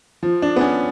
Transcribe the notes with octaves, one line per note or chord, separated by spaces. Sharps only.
F3
D4
B3
C#4